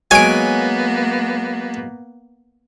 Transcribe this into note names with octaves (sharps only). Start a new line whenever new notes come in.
F#3 G#3 A#3 B3 C#5 G#5 G#6 D7